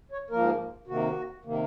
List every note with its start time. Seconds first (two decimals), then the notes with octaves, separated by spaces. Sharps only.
0.12 C#5
0.30 G#2 F3 A#3 A#4
0.87 C3 D#3 A#3 F#4
1.45 C3 D#3 A#3